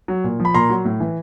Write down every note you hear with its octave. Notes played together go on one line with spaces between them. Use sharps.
F#3
A#2
F3
B5
A#2 A#5 C6
F#3
A2
E3